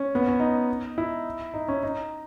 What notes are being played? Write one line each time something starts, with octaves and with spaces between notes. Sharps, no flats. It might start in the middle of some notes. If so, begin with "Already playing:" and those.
Already playing: C#4
B3
C#4
D#4
E4
D#4
C#4
D#4